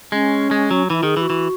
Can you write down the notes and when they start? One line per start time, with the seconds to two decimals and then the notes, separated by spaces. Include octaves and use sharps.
0.12 G#3 C#4
0.51 G#3
0.71 F#3
0.90 E3 E4
1.03 D#3 G#4
1.17 E3 G#4
1.22 F#4
1.30 E3